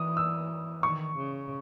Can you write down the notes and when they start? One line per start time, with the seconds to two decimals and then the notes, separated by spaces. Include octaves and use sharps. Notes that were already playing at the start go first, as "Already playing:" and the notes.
Already playing: E3 D#6
0.17 E6
0.83 D#3 C#6
1.17 C#3